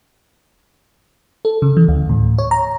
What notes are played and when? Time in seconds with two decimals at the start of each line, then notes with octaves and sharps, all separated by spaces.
1.45 A4
1.62 C#3
1.77 E3
1.88 D2
2.09 A2
2.38 C#5
2.51 A#5